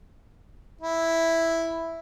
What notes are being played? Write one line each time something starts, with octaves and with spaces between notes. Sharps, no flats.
E4